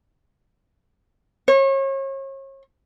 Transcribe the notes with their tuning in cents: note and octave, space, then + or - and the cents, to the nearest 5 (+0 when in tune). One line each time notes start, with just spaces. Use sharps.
C#5 -35